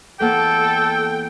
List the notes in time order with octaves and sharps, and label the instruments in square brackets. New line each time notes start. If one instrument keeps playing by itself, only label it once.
[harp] E2 A#3 F#5 [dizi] A4 [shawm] G5